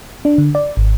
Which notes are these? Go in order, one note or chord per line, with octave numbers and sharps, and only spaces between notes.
D4
D3
D5
G#1